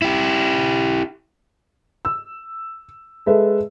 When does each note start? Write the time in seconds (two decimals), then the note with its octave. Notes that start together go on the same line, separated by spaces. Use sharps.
0.02 E4 G4
2.05 E6
3.26 G#3 A4 B4 E5